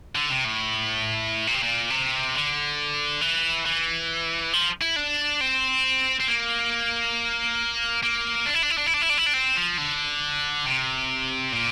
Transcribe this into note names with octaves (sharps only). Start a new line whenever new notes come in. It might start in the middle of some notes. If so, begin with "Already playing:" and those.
D3
C3
A2
A#2
C3
A#2
C3
D3
E3
E3
F3
E4
D4
C4
C4
A#3
A#3
D4
E4
D4
E4
D4
E4
D4
E4
D4
E4
D4
C4
F3
D3
C3
A#2